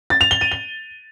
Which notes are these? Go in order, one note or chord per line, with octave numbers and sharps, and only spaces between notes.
A6
F7
G7
D#7
G7